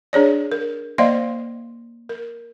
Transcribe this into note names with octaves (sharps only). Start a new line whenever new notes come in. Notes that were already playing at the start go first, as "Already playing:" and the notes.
D4 G#4 C#5 D5
A#4
A#3 C5 D5 D#5 F5 C6
A#4